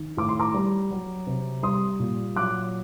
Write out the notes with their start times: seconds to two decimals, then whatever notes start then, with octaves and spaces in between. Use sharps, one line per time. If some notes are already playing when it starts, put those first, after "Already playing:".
Already playing: D#3
0.17 A2 D6
0.29 C6
0.39 A#5 D6
0.54 G3
0.91 F#3
1.27 C3
1.63 G3 C6 D#6
2.00 A#2
2.36 F#3 D6 F#6